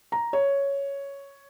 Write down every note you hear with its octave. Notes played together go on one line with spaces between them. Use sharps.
A#5
C#5